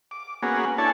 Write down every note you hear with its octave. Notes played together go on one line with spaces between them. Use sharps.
D6
A#3 B3 C#4 F#4 G#4
D4 E4 A4 C#5 G#5 A5